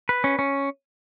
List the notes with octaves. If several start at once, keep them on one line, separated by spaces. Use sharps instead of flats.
B4
C#4
C#4